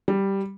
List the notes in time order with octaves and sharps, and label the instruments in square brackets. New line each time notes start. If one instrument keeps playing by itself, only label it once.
[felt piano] G3